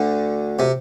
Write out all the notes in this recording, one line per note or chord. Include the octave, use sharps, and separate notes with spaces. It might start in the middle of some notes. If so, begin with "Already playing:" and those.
Already playing: D2 D3
C3